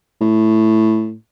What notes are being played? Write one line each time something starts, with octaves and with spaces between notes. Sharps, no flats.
A2